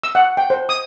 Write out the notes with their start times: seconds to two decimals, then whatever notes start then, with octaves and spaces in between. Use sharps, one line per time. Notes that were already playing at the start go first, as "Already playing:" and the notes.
0.04 E6
0.15 F#5
0.37 G5
0.50 C5
0.69 D#6